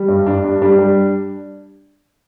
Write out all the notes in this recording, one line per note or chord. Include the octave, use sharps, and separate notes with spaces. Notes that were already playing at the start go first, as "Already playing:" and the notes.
Already playing: G3
G2
G2 D4
G2
G3 D4
G3